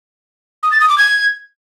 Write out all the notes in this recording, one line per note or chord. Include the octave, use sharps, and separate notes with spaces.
D#6
A6
D#6
D6
G#6